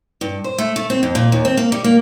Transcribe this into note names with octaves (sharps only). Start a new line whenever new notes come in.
G2
C5
A3
A3
C4
F2
A#2
D#2
C4
A#3
G3
A#3